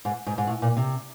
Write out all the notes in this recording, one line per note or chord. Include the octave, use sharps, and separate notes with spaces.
G#2
G#2
G#2
A2
A#2
C3